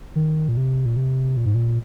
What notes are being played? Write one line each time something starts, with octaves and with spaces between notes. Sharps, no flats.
D#3
A#2
C3
A#2
C3
A#2
G#2
A#2